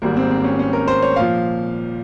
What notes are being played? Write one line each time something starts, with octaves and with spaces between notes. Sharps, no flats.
G#1 G#2 G3 A#3
C4
C4
C#4
C#4
A#4
C5
C#5
A#2 F3 F5